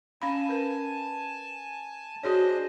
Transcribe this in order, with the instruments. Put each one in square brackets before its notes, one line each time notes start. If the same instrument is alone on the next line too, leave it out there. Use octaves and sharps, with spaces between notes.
[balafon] C#4 F5 B5 [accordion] G#5 A5
[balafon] A#4 B4
[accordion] D4 C5 D#5 [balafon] F#4 G#4 C#5